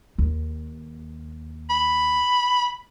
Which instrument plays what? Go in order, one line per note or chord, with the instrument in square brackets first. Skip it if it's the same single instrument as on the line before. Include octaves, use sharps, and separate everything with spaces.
[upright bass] D#2
[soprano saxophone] B5